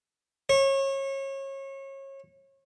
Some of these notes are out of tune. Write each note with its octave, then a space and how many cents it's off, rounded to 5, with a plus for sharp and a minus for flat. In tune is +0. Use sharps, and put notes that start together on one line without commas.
C#5 -30